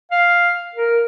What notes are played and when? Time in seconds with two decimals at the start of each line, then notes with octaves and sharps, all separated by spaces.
0.11 F5
0.75 A#4